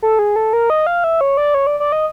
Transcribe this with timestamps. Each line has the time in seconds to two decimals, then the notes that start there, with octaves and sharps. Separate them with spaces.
0.02 A4
0.19 G#4
0.36 A4
0.53 A#4
0.70 D#5
0.87 F5
1.04 E5
1.21 C#5
1.37 D5
1.54 C#5
1.67 D5
1.80 D5
1.92 D#5